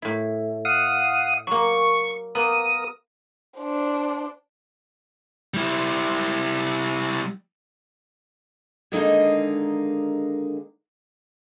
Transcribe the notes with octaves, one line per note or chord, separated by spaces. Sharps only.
A2 E4
F5 F#5 D#6
F#3 A#3 C#6
A#3 B3 A#4 D#6
D4 C5
G3 E4
D3 D#3 G#3 A#3 D4 D#4